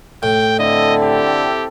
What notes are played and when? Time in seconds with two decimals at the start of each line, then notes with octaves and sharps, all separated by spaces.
0.23 A2 G5
0.59 D3 C4 E4 A4 D#5
1.03 G4